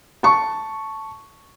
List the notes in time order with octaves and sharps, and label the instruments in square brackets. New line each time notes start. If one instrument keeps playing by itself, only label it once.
[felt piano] A5 C#6